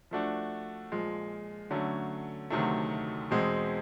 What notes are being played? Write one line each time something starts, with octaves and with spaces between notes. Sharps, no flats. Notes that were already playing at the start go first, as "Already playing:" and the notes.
F3 A3 D4 F#4
A#2 F3 G#3
D3 F#3 A3 C#4
D2 C3 D#3 F#3 A3
E2 B2 G#3 C4